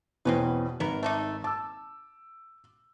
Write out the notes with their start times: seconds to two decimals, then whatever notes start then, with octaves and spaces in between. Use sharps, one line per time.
0.25 E2 B2 C4 C#4 B4
0.80 G#1 F#3 B3 A#4
1.03 A3 D4 D#4
1.44 A5 D6 E6